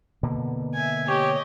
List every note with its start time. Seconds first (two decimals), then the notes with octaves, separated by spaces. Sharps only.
0.23 B2 D3 A#3
0.74 E5 G#5
1.08 G4 C#5 D#5